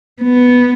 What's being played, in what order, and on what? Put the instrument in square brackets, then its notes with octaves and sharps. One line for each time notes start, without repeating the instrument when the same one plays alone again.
[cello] B3